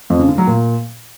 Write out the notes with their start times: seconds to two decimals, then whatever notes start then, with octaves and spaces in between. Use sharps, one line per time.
0.10 F2
0.19 C#3
0.29 D3
0.38 F#3
0.47 A#2